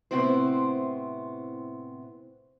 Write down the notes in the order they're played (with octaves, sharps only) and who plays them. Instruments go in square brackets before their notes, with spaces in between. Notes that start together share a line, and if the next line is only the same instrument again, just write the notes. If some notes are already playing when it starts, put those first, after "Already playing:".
[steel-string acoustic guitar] A2 C3 B3 C4 E4 C5